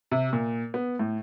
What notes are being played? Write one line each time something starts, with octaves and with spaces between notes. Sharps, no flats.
C3
A#2
B3
A2